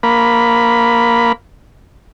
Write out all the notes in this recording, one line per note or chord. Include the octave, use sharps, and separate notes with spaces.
A#3 B5